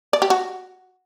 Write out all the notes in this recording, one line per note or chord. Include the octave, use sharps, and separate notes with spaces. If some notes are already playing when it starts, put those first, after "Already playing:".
D5
G4
F#4